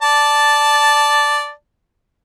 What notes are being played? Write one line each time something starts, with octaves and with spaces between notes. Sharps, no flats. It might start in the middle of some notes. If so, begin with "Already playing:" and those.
D5 A5